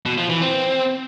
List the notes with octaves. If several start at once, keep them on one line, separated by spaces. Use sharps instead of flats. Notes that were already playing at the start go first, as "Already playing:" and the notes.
B2
F3
E3
C4